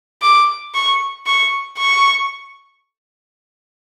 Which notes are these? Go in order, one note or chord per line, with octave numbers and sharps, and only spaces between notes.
D6
C#6
C#6
C#6